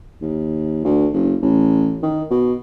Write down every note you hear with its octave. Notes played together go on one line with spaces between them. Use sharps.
D#2
D2
F#1
A1
D#3
B2